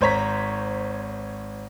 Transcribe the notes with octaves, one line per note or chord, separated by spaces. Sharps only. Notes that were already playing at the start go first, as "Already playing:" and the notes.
G#1 C5 C#5 A#5 B6